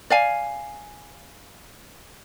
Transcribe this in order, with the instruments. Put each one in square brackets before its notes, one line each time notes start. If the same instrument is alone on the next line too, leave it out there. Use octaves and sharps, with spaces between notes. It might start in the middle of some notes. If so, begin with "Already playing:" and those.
[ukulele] D5 F5 G#5